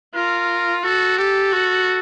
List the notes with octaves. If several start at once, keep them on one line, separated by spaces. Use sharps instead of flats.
F4 A#4
F#4 A4
G4 A4
F#4